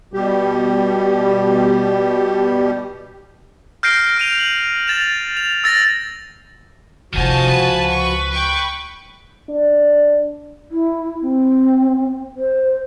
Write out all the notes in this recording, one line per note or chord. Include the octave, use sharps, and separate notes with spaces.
B2 G3 G4
F6 G6 A#6 C7 D7
F6 D#7 F7
F#7
A6 E7 F7
F7
E6 A6 A#6
F#1 C3 D#3 F3 D#4 F#4 G#5 A5
C#2 B4
C#6
G5 C#6
D4
E4
C4
C5